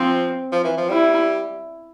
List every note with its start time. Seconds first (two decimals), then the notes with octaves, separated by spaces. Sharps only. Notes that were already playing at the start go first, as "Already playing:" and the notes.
Already playing: F3 C4
0.52 F3
0.64 E3
0.77 F3
0.89 G3 E4